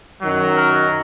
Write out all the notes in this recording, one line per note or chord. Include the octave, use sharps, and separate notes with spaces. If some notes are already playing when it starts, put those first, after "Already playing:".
F#2 D#3 F#3
A#4